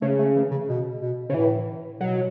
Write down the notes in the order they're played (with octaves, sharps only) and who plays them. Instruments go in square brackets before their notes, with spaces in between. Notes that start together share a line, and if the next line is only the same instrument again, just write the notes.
[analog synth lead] C#3 [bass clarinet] A3
[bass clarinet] A3
E3
C#3
B2
B2
[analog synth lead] C#3
[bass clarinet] A2 [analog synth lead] E3
[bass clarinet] B2 [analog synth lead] F#3